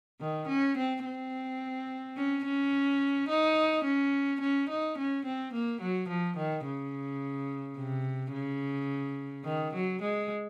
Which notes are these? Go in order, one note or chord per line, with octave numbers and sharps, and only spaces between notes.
D#3
C#4
C4
C4
C#4
C#4
D#4
C#4
C#4
D#4
C#4
C4
A#3
F#3
F3
D#3
C#3
C3
C#3
D#3
F#3
G#3